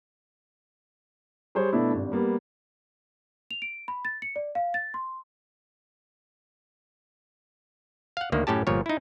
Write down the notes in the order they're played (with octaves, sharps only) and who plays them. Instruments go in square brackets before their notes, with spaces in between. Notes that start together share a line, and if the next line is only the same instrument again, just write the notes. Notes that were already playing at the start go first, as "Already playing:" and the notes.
[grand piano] G3 G#4 C5 C#5
B2 A3 B3 D4 E4
G#1 G2
G3 A#3 B3
[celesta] F7
D7
B5
A6
C#7
D5
F5
A6
C6
[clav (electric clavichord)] F5 F#5
D2 D#3 A#3
F#2 A2 C#4 G4 A5
G1 A#2 F3 C#5
D#4 E4